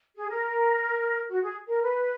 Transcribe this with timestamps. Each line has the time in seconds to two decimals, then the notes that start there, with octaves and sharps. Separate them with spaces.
0.16 G#4
0.29 A#4
1.30 F#4
1.42 G#4
1.68 A#4
1.81 B4